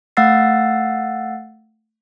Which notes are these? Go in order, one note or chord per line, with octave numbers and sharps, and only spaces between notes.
A3 F5 F#5 E6 A6 C7